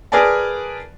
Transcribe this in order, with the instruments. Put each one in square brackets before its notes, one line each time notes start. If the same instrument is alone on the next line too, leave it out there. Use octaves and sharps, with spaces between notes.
[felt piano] G#4 A#4 B4 D5 G#5 A5